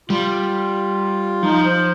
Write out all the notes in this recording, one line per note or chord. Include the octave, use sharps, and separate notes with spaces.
G3 F4
F3 D#4
C5